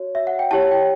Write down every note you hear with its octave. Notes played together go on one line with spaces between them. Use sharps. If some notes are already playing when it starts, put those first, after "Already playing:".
Already playing: F#4 C#5
E5
F#5
G5
E4 G4 C#5 A5
G5